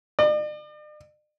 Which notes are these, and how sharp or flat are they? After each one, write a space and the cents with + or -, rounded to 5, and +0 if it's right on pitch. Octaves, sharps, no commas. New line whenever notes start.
D5 +45